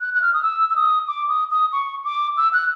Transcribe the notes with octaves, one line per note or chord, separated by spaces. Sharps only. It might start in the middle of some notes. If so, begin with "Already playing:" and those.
F#6
F#6
F6
D#6
E6
E6
D#6
D6
D#6
D#6
C#6
D6
E6
F#6